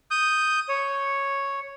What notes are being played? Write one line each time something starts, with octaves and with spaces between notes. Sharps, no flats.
D#6 G6
C#5